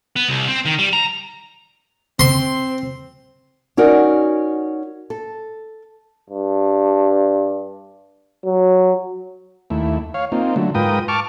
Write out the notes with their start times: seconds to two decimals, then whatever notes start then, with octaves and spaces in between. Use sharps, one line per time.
0.16 B3
0.29 C2
0.48 C4
0.65 D#3
0.79 G3
0.93 A#5
2.19 C4 C6
3.77 C#4 D#4 F#4 A#4 D5
5.10 A4
6.30 G2
8.45 F#3
9.70 D#2 A3 E4
10.14 C#5 F5
10.32 A#3 C4 D#4 F4
10.56 D3 F#3 A3
10.75 G#2 F4 A#4 B4 G5 D#6
11.08 A5 C#6 D6 F6